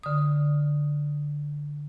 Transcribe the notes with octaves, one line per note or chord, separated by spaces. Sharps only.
D3 D#6